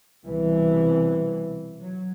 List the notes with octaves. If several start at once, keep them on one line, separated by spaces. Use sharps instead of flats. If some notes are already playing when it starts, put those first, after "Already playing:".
C2 B2 E3
F#3